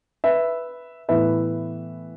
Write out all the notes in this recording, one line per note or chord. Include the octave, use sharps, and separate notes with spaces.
B4 E5
A2 E3 B3 B4 E5